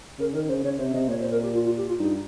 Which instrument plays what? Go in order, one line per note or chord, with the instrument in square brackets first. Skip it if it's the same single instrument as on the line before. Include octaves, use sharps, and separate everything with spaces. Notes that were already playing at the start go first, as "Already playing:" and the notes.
[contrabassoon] C#3 [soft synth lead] A#4
[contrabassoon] D#3 [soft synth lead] A#4
[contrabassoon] C#3 [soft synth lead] C5
[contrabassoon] C#3 [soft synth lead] C#5
[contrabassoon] C3 [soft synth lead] C5
[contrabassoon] C3 [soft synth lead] D#5
[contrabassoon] A#2 [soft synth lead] C#5
[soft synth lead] C5
A#4
G4
F4
F4
G4
F4
[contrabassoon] G2 [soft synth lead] D#4